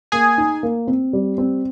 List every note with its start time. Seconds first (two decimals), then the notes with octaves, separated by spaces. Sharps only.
0.12 A#3 G#4 G#5
0.38 D#4
0.63 A#3
0.87 C4
1.13 G3
1.38 C4